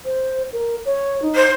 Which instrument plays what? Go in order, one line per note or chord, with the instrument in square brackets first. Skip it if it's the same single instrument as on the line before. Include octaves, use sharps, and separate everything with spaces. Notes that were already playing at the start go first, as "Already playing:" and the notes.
[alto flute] C5
A#4
C#5
D#4
[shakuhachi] C5